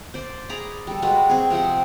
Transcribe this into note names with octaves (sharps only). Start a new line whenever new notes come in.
C5 D5
G#4 D5 A#5 B5
G3 A4
G3 G#3 F#4 B4
C4 G#4
C3 F3 G4 F#5